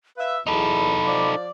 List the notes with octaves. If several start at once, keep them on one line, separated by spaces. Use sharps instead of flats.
B4 E5 F5
E2 D#4 A4 B5
F3 D5